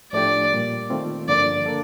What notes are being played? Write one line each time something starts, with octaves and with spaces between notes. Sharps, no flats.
A2 F3 A3 D4 G4 D5
A#2 G3 A#3
D#3 A3 C4 F4
G2 D3 F3 A#3 D5
A#3 D4 A4